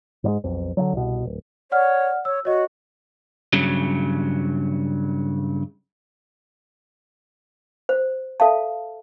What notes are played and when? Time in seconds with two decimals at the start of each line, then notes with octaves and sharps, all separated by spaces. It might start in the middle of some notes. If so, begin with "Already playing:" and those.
0.24 G#2 G3 G#3
0.44 B1 F2
0.77 D3 F3 F#3
0.93 C2 B2
1.25 D1
1.72 C#5 D5 F#5 F6
2.25 C#5 E6
2.45 F#4 C#5 D#5
3.53 G2 C#3 F#3
7.89 C5
8.40 A4 E5 F5 A5